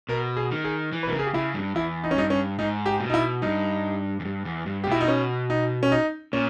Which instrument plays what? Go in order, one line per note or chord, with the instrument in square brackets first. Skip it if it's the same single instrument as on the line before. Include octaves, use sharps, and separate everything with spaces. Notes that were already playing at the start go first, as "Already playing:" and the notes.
[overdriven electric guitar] B2 [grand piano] A#4
[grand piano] G#4
[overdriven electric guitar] D#3
[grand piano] G#4
[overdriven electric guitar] E3
[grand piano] B4
[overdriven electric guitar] B2
[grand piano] A#4
[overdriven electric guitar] C#3
[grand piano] G#4
G4
[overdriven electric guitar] C#3 [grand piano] E4
[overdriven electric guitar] G2
[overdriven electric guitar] E2 [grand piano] E4
[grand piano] D#4
C#4
[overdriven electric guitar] G2 [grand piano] D#4
[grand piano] C#4
[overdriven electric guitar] G#2 [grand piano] D#4
[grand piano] G4
[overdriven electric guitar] B2
[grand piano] D#4
E4
[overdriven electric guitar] G2 [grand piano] D#4
[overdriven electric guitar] E2
G2
E2
G2
[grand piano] G4
[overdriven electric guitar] B2 [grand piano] E4
[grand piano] D#4
C#4
D#4
C#4
D#4
[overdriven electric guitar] A#2 [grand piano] C#4